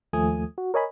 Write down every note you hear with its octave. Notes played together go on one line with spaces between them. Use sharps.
D#2 F3 A3 G#5 D#6
F#4
A#4 C#5 D#5 G#5 B5